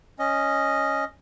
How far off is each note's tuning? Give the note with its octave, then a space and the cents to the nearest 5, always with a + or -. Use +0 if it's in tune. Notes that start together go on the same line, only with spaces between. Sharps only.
C#4 +0 D#5 +0